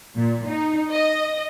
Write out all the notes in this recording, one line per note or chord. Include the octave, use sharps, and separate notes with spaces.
A#2
D#4
D#5